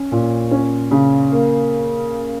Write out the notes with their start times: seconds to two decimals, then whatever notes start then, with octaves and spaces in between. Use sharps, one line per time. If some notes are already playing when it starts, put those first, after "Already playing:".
Already playing: C#4
0.12 A#2
0.51 C#4
0.91 C#3
1.32 A#3